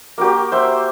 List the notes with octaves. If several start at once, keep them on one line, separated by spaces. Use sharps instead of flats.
A#3 F#4 G4
C5 E5 C6